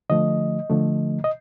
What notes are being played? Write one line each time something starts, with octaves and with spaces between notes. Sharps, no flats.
D3 F3 A3 D#5
D3 F3 A3
D#5